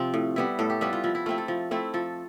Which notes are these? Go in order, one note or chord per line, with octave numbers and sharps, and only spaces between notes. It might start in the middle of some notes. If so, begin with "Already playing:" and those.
Already playing: C3 F3 C4 F4
A2
G3 B3 E4
A2 A4
G4
G3 B3 E4 F4
F4
F3 E4
E4
A3 C4 E4 F4
A4
F3
A3 C4 E4
F3 A4